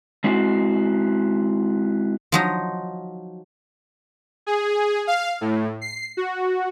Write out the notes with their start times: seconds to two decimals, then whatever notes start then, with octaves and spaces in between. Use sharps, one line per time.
0.24 G#3 C4 E4 F#4
2.32 F3 F#3 D#4
4.47 G#4
5.07 F5
5.41 A2
5.81 C7
6.17 F#4